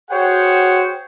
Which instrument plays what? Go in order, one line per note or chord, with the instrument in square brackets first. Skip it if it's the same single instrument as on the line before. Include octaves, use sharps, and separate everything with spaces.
[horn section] F#4 G#4 C5 C#5 F#5 G5